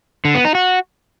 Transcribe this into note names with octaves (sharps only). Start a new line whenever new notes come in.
D3
B3
D#4
F#4